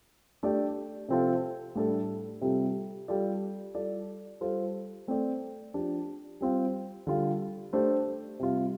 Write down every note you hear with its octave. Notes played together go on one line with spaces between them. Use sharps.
A3 D4 G4 D5
C3 F3 C4 F4 A4
A2 G3 D4 A4
C3 G3 F4 A4
G3 F4 A4 D5
G3 F4 A4 D5
G3 F4 A4 C5
A3 C4 A4 D5
F3 D4 G4
G3 C4 F4
D3 G3 F4
A3 D4 G4 C5
C3 G3 F4